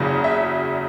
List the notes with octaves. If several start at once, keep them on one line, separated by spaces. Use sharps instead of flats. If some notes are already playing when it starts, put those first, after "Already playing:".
Already playing: F#1 E2 C#3 F#3 D5
E5